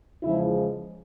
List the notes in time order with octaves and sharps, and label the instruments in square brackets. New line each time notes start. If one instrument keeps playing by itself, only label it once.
[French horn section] E2 C#3 F3 G#3 E4